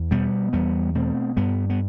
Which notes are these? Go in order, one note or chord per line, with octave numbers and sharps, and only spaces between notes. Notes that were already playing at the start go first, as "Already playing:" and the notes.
Already playing: E2
B2 G3 B3
E2 G3 B3
B2 A3 C4
G2 G3 B3
B3